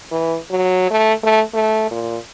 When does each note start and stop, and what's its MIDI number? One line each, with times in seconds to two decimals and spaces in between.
0.11 0.37 52
0.51 0.87 54
0.91 1.13 57
1.23 1.42 57
1.54 1.87 57
1.91 2.17 46